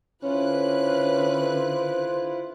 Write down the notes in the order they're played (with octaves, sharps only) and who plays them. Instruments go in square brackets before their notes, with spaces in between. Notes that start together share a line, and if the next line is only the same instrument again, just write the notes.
[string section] D3 B4 F#6 [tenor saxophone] C#4 [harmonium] E4 F4 [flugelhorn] C5